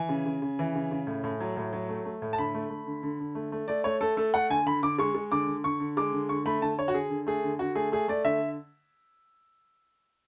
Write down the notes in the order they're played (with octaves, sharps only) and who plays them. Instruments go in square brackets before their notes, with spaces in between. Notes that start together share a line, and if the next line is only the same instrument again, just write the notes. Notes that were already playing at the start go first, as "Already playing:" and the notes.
Already playing: [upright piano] E3 G#5
C#3
C#3
C#3
E3
C#3
C#3
A2
A2
F#3
A2
F#3
A3
A3
A2
A5
D3 B5
A3
A3
D3
D3
D3
A3
A3
A3 D5
A3 C#5
A3 A4
A3 A4
A3 F#5
D3 G#5
D3 B5
D3 D6
G#3 C#6
G#3
D3 D6
D3
D3 C#6
D3
G#3 D6
D3
D3 C#6
A3 B5
D3 A5
D3 C#5
F#4
D3 G#4
D3
A3 G#4
D3
D3 F#4
A3 G#4
A3 G#4
A3 D5
D3 E5